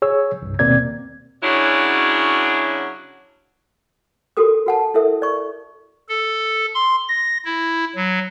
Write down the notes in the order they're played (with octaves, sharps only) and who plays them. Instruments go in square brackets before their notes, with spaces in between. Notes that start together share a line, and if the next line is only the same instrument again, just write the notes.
[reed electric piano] G#4 C#5 E6
C2 G2
D#2 B2 A#3 C4 D5 G#6
[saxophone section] C#3 F#3 C#4 D4 E4 F#4
[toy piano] F#4 G4 A4 A#4 D#6
F#4 F#5 A5
E4 A4 A#4 E5
D5 C#6
[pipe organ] A4
C6
A#6
E4
F#3